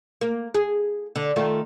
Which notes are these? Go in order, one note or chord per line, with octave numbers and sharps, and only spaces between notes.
A#3
G#4
D3
D#3 A3 F4